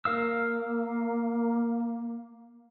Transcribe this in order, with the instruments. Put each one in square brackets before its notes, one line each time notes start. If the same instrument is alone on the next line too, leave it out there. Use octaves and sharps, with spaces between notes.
[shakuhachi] A#3 [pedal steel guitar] A#4 F5 E6